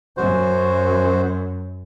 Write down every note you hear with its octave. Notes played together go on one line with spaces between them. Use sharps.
F#2 F#4 C5